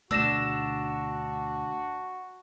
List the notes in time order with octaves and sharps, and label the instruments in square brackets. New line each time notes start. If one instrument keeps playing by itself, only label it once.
[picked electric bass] D2 B2 A3 [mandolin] D4 [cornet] F#4 [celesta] E6 A#6 E7